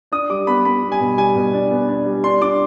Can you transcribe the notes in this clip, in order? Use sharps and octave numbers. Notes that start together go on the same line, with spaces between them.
D4 D#6
G3 D6
B3 B5
B3 B5
G3
G#5
B2
G3 G#5
B2
D4
B3
D4
G3
D4 C6
D4 D6